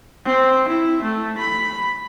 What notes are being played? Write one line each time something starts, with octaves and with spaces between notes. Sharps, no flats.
C4
E4
A3
B5